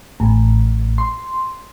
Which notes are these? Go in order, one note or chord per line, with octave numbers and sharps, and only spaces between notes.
A1
C6